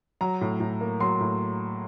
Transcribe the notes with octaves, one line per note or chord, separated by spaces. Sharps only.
F#3 A#5
A2
A2
A#3
F#3 C6
A2